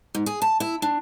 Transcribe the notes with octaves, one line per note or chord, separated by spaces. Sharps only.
G#2
G#4
A5
E4
D4